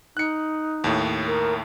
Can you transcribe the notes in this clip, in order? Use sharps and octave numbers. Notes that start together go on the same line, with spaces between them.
D#4 F#6 C#7
D#2 A2
A#4